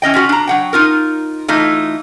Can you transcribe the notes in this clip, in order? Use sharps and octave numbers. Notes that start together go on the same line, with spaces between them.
E3 C#4 D#5 G5
C#4 F4 F#4
D4 A#5
F#3 F#5 G5
D#4 F4 A#4
E3 A3 D#4 F4